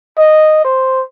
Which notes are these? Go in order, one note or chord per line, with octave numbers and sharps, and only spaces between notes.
D#5
C5